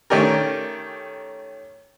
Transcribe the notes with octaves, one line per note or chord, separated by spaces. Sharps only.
D#3 A3 C#4 G4 A#4